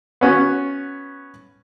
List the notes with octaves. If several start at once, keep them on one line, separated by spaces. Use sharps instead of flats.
B3 C#4 F#4